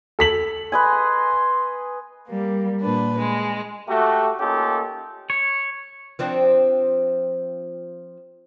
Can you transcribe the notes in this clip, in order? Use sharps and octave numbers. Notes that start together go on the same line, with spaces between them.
A4 B6 F#7
B4 D#5 G#5 C6
G3 A#3
A#2 D4 B4
G#3
A3 F#4 G4
A#3 C#4 D#4 F4 G4 A4
C#5
F3 C4 D4